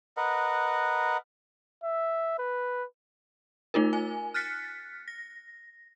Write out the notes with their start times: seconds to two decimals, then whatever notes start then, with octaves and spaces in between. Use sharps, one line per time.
0.17 A#4 B4 D#5 F#5
1.84 E5
2.39 B4
3.74 A3 D#4 F4 A#4
3.93 G#5
4.34 F6 F#6 A6 B6 C#7
5.08 A#6